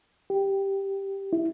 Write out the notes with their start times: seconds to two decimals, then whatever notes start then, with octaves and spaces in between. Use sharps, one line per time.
0.30 G4
1.33 E4